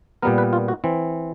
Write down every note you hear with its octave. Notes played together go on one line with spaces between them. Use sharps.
A#2 G3 B3 A#4
B4
F4
F#4
E3 C4